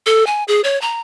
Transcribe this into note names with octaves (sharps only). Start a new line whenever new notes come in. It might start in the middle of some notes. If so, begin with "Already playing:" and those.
A4
G#5
G#4
C#5
A#5